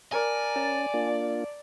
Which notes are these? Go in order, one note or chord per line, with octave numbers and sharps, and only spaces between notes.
A#4 D5 G#5 A5
C#4 A5
A#3 D4 F4